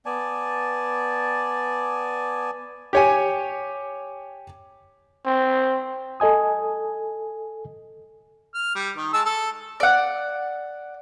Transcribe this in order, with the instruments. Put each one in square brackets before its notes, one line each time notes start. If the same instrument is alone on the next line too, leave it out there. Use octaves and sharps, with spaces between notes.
[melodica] B3 D5 G#5 A5
[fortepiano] G4 C#5 G#5
[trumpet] C4
[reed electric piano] A4 D#5 G#5 D#6
[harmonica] F6
G3
D#3
G#3 A5 E6
A4
[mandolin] D5 F#5